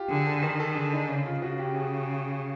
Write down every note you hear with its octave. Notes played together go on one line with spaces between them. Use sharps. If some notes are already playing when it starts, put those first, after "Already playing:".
Already playing: F4 G4
D3 G#4
A4
D#3 A#4
A4
D3 G#4
D#4
C#3
F4
C#3 F#4
G4
G#4